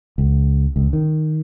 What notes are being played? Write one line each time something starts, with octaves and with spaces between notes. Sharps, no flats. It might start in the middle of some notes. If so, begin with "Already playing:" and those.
C#2
C#2
D#3